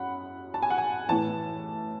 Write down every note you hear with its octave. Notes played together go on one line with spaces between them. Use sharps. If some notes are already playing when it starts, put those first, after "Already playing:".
Already playing: F#2 F#5 B5
A5
G#5
F#5
G#5
A2 E3 A5